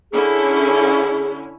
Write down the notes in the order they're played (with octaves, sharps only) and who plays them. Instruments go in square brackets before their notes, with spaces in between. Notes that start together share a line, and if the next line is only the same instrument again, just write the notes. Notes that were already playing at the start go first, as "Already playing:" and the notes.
[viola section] D3 C#4 E4 [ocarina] G#4